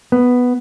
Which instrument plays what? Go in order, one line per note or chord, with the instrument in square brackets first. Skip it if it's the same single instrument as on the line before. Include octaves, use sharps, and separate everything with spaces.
[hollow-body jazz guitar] B3